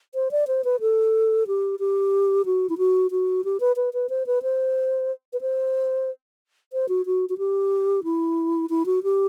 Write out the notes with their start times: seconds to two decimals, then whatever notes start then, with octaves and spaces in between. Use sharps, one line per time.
0.14 C5
0.31 D5
0.47 C5
0.64 B4
0.80 A4
1.47 G4
1.79 G4
2.45 F#4
2.69 E4
2.78 F#4
3.11 F#4
3.44 G4
3.60 B4
3.76 B4
3.93 B4
4.09 C5
4.26 B4
4.42 C5
5.33 B4
5.41 C5
6.73 C5
6.89 F#4
7.06 F#4
7.29 F#4
7.38 G4
8.04 E4
8.70 E4
8.86 F#4
9.03 G4